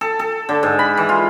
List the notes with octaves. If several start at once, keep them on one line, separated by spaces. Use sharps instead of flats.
A4
A4
D3
G#2
B5
E3
F4